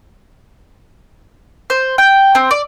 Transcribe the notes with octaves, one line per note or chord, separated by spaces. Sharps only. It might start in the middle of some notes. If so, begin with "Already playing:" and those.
C5
G5
C4
D5